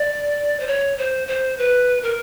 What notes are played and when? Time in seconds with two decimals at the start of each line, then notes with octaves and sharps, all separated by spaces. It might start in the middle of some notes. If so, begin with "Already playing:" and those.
Already playing: D5
0.60 C5
0.67 C#5
0.98 C5
1.28 C5
1.58 B4
2.03 A#4